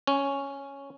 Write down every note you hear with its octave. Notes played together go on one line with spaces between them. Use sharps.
C#4